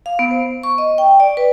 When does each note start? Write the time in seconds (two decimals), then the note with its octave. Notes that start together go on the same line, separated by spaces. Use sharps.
0.06 F5
0.19 B3
0.31 C5
0.63 C#6
0.78 D#5
0.98 G5
1.20 D5
1.37 B4